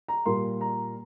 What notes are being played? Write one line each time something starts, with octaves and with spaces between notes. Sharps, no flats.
A#5
A#2 G3 A#3 C6
A#5